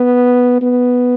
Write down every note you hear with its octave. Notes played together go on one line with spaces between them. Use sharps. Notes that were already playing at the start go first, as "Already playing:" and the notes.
Already playing: B3
B3